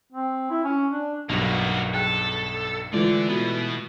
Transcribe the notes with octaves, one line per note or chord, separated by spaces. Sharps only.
C4
E4
C#4
D4
B1 G2 A#3 F#4 A5
G#4 A4 G5 F#6
D3 E3 G#3 A3 E4 F4 D5
B2 B3 F4 F#4